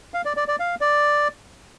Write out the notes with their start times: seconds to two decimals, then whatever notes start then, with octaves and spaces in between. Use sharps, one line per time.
0.14 F5
0.25 D5
0.37 D5
0.48 D5
0.60 F5
0.81 D5